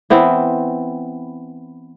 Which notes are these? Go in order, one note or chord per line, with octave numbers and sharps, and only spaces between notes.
E3 B3 C4